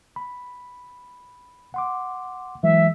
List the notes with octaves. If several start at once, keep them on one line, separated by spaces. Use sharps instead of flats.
B5
F#5 C6 D6
E3 F#3 G#3 E5